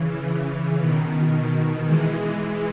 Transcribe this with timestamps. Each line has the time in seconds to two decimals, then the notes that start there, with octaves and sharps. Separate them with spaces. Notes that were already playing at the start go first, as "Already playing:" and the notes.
Already playing: C#3 E3
0.26 C#3
0.78 B2 D#3
1.30 B2 D#3
1.83 E3 G#3
2.35 E3 G#3